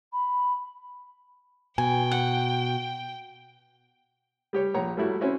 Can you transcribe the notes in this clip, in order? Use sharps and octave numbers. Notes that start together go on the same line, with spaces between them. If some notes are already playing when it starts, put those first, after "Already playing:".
B5
B2 G5 G#5
F#5
G3 G4 C#5
A#1 C#5 A#5
G3 A3 E4 F#4
C4 C#4 E4 F#4